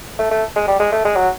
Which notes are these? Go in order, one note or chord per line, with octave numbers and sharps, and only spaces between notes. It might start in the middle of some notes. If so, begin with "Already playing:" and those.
A3
A3
G#3
G3
G#3
A3
G#3
F#3